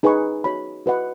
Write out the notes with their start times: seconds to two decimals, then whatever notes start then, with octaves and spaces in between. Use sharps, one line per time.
0.03 D#4 G#4 B4 G#5 C#6
0.44 F#4 C#5 B5
0.86 F#4 B4 D#5 F#5